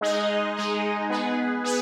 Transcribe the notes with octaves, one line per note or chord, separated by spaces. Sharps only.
G#3 D#4 G#4 D#5
G#3 D#4 G#4 D#5
B3 G#4 B4
B3 G#4 B4